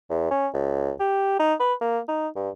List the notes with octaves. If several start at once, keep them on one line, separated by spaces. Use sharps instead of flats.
E2
C#4
C#2
G4
D#4
B4
A#3
D#4
G2